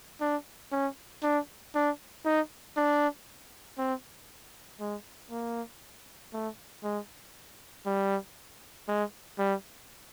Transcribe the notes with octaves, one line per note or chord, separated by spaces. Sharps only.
D4
C#4
D4
D4
D#4
D4
C4
G#3
A#3
A3
G#3
G3
G#3
G3